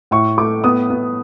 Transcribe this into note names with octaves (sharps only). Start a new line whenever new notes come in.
A2 C#6
A3 D6
B3 D#6
B3